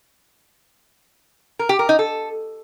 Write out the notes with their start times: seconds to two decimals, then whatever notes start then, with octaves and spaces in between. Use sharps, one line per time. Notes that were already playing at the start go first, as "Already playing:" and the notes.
1.59 A#4
1.69 G4
1.79 A#4
1.89 D#4
1.99 A4